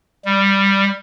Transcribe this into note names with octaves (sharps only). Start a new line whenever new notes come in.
G3